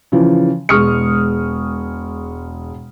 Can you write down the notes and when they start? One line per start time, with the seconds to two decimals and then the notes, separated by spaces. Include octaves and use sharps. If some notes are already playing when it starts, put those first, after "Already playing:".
0.12 C#3 E3 F3
0.69 E1 G#3 C#6 D#6 F6 C#7